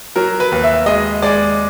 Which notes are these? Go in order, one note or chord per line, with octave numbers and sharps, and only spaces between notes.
F#3 A#4
B4
D#2
E5
G#3 D#5
G#3 D5